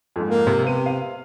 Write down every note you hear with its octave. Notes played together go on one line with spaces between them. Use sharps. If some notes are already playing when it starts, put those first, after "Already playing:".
F2 G#2
A#3
C3
C3 B3 D#7
F5